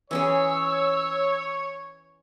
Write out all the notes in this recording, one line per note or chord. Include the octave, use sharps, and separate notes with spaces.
E3 C#4 G#4 C#5 E6